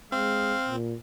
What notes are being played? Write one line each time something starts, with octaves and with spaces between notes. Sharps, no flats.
G#3 C4 F5
A#2